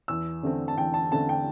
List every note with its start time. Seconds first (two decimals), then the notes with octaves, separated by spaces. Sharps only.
0.08 E2 E6
0.43 D3 A3 C4
0.68 A5
0.77 E2 G5
0.94 A5
1.11 D3 A3 C4 A5
1.29 G5